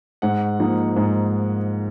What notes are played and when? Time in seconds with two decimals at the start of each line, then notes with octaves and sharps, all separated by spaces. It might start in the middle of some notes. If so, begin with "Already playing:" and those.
0.22 G#2 F#5
0.59 F3 A#3 D#4
0.96 G#2